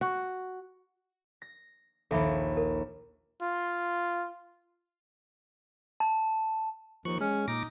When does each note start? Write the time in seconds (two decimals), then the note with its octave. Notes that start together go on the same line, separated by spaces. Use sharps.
0.01 F#4
1.42 A#6
2.11 A#1 D#2 A4 E5 B5
2.57 A#4
3.42 F4
6.00 A5
7.05 D#2 F3 C#6 F#6
7.20 G#3 C#4
7.48 A#2 D#4 D6 A#6